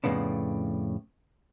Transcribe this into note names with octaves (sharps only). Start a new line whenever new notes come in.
F2 A2 C#3 B3 D4